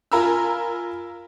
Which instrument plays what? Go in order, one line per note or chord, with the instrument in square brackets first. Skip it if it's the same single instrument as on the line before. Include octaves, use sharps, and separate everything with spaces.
[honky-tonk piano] F4 A#4 G#5 A#5 B5 E6